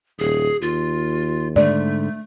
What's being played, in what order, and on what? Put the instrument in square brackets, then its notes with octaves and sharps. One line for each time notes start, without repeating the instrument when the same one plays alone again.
[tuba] D#1 [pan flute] G#4
[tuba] D#2 [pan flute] F4
[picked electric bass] G#2 D3 [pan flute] A3 [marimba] D5